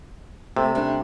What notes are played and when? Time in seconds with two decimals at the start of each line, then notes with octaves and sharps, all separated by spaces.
0.56 C3 A3
0.75 G3 C#4 D4